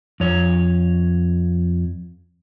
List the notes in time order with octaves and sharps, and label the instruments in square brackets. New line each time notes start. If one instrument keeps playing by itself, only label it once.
[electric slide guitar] F2 C#5